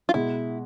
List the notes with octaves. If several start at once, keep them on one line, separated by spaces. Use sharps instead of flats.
F4
B2 G#3 E4